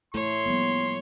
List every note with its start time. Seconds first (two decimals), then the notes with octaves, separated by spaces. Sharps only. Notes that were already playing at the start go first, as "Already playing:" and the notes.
0.14 A3 E4 A4 C#5 C6
0.46 F3 G3 A#3 B3